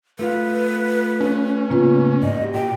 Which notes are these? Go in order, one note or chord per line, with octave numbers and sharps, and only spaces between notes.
A3 F4 B4 F5
C#4
A2 C#3 A#3 B3 F4 B4
G#2 D5 D#5
F#4 G4
A#2 G5